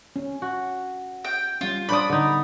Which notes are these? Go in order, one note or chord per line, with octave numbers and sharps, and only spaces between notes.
C#4
F#4
G5
G3 C#4 F4
D4 C5 D5 B5 D#6
D3 B3 D#4 D5